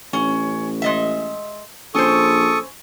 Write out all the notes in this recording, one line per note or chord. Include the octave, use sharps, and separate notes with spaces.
A1 C#4
G#3 D#5 E5
A#1 C#4 A4 C5 C#6 D#6